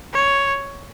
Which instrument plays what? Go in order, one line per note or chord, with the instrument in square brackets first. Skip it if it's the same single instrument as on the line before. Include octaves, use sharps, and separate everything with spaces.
[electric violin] C#5